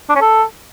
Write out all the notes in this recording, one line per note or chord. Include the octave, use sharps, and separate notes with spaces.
D4
C#4
A4